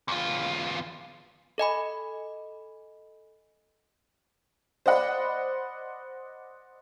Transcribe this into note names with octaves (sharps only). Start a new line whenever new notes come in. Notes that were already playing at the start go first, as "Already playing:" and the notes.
E2 F4
A4 D#5 G#5 B5
C5 D5 D#5 F#5 B5